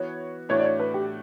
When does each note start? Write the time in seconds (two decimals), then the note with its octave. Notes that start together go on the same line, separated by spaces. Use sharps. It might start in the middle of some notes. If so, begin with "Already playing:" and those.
Already playing: E3 B3 F#4 C#5
0.49 A2 E3 A3 D4 F#4 C#5
0.59 D5
0.65 C#5
0.79 B4
0.94 G4